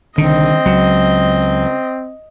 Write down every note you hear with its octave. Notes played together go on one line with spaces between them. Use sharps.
C2 D3 D#3 C4 D#5
C#2 F#3